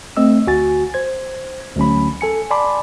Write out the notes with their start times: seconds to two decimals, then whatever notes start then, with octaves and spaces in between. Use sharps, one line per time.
0.17 A3 C4 D#5 E6
0.47 D2 F#4 G#5 A6
0.94 C5 G#6
1.76 D2 F#3 C#4 B5
2.21 A4 G#5 C#7
2.51 D5 G#5 A5 B5 C6 D6